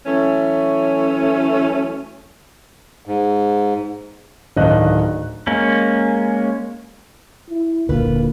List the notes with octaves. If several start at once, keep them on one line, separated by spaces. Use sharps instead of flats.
E3 F#3 A3 C#4
G#2
D1 D#3 D4 D#5 F5 F#6
G#3 A#3 C#4
E4
D#1 A#2 D3 A#3 F4 B4